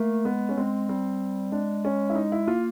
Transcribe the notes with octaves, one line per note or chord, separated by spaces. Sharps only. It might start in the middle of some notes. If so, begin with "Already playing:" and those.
Already playing: A3 A#3
G#3 B3
C#4
G#3 C4
G3 C4
G#3 D4
C#4
E4
D#4
E4
A#3 F4